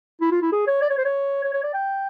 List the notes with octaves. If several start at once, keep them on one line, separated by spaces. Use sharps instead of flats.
E4
F4
E4
G#4
C#5
D5
C#5
C5
C#5
C#5
C#5
D5
G5